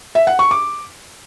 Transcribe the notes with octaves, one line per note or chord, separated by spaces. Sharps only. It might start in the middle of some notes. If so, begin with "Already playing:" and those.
E5
F#5
C#6
D6